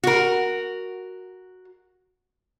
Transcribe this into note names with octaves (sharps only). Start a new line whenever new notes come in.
F#4 A#4